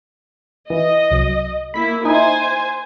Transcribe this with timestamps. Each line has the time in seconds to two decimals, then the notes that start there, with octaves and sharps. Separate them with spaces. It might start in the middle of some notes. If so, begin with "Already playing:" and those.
0.70 E3 D#5
1.11 C2 F#3
1.74 A#3 E4 B5 B6
2.05 D#4 E4 C5 G#5